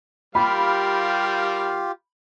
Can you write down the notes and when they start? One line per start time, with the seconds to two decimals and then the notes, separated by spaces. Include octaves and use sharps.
0.35 G3 F4 G4 A#4 F5 B5